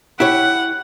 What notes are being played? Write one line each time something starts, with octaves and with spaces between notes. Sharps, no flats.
E4 G4 C#5 F#5